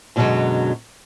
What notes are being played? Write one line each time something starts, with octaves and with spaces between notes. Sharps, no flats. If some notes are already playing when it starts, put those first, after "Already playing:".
F#2 B2 D3 D#3 F#3 G#3